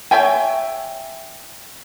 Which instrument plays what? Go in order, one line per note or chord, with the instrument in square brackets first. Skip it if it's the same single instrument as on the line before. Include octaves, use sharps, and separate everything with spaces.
[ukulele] C#5 E5 G5 G#5